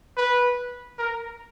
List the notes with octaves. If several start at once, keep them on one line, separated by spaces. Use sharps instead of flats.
B4
A#4